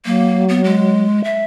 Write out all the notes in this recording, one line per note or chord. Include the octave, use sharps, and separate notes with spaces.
F#3 A#3
B3
G#3
E5